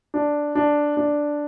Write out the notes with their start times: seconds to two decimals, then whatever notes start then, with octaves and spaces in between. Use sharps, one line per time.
0.14 D4
0.55 D4
0.97 D4